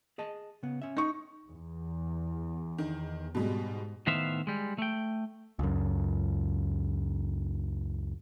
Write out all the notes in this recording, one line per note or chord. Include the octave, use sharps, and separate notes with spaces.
G#4 D#5 A5
C#3 B3
C#4 E5
D#4 C#6
E2
D#3
G#2 B2 G3 G#3
A2 D#3 B3 C5 E5 F5
G3 G#3
A3 G5
C#2 F#2